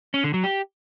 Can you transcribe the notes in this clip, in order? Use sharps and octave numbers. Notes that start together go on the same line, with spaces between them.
C#4
D3
F#3
G4